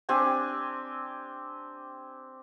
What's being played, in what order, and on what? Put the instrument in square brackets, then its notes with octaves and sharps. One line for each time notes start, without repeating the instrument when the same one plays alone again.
[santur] C4 D4 G4 G#5